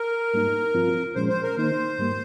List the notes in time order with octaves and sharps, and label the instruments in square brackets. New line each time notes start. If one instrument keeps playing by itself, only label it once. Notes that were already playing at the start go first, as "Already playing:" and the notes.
Already playing: [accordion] A#4
[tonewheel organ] G#2 G3 A#3 D#4
G2 F3 C4 F4
[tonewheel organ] A#2 F3 G#3 C#4 [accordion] C5
[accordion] C5
A#4
[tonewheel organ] D#3 A#3 D#4 [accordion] C5
[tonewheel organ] G#2 G3 A#3